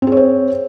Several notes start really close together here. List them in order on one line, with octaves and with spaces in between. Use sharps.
C4 G#4 C#5 C5